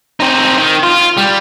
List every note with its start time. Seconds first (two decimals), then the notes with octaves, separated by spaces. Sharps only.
0.20 C4 D#4
0.58 D#3
0.83 F4
1.17 G3